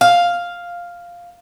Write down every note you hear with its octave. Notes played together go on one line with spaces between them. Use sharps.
F5